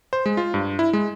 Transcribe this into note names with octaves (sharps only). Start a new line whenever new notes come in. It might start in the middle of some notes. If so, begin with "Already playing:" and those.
C5
G#3
F4
G2
E4
G#3